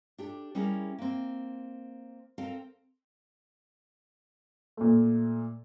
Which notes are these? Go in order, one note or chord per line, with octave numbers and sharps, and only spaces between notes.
D4 G4 A4
G3 C#4 E4 G#4 A#4
A#3 C4
C4 A4 A#4 F5
A#2 A3